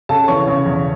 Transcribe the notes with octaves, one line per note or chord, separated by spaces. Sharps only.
C#3 A4 A5
E3 C#5 C#6
C#3
E2